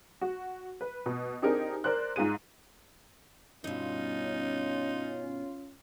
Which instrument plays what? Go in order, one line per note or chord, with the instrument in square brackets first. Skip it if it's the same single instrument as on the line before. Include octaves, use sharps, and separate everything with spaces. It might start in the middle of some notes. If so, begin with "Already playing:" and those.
[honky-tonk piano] F#4
B4
B2
C4 D4 D#4 G4 G#4 A#4
A#4 C5 D5 F#6
G#2 F4 G#4 D#7
[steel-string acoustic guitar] G2 B2 [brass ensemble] C#4 F4 [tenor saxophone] D#4